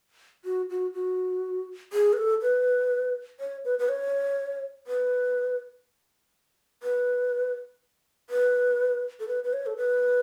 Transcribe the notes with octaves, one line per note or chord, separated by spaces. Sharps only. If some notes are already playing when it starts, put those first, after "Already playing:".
F#4
F#4
F#4
G#4
B4
A4
B4
C#5
B4
B4
C#5
B4
B4
B4
A4
B4
B4
C#5
A4
B4